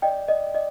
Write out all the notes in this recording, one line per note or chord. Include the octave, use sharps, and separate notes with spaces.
D5 D#5 G5
D5 D#5
D5 D#5